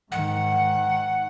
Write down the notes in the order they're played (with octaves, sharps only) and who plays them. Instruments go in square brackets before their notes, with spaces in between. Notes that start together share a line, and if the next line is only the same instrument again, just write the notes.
[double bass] G#2 D#3 [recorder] F#5